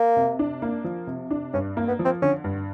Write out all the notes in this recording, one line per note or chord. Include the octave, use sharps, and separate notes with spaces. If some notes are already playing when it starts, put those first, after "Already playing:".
Already playing: A#3
C3
D4
A#3
F3
C3
D4
G2 C#4
A#3
B3
F3
C4
D3 C#4
G2